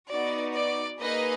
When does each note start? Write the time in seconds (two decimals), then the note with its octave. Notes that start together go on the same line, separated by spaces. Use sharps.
0.10 B3 D#4 F#4 D5
0.55 D5
1.00 A#3 D#4 G#4 B4 D#5